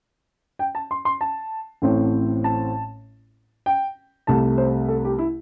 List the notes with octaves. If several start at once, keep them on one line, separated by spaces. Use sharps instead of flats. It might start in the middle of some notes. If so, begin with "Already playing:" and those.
G5
A5
C6
C6
A5
A1 A2 A3 C4
A5
G5
C2 C3 A3 A5
C5
A4
G4
E4